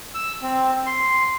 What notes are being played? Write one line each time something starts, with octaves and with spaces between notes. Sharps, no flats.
E6
C4
C6